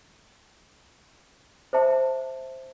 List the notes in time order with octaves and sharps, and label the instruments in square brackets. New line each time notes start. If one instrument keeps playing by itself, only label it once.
[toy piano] C5 E5 A5